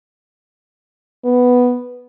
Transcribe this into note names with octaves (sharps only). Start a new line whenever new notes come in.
B3